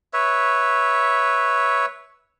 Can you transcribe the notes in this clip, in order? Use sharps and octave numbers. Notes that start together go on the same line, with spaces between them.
B4 C#5 E5